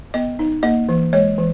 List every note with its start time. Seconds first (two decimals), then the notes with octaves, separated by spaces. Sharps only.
0.14 B3 D#5
0.39 D#4
0.63 A#3 D#5
0.89 E3
1.13 G#3 C#5
1.38 E3